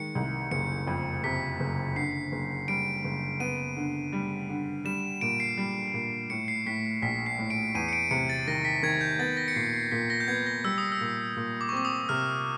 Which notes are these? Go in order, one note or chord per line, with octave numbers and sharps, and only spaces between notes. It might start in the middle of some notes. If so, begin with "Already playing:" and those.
Already playing: D#3 G#3 C#7
C2
F#1 C#7
F2
C3 B6
F#1
D3 C7
F#1
G3 D7
F#1
B3 D#7
D3
G3
D3
G3 E7
A#2 D7
C7
G3
A#2
A2 C#7
C7
A2 B6
A#1 B6
C7
A2
D7
E2 D#7
C#7
D7
C3 C#7
A6
D#3 A#6
B6
D#3 G#6
G6
B3 A6
A#6
C#7
A#2 C7
C7
A#2 B6
A#6
G6
B3 G#6
A#6
G3 E6
D#6
E6
A#2
A#2
D6
C#6
C4 D6
D#6
C3 F6